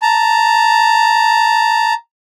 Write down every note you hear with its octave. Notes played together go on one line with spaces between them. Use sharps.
A5 A#5